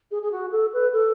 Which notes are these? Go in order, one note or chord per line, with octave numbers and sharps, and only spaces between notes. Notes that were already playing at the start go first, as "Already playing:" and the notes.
G#4
G#4
F#4
A4
B4
A4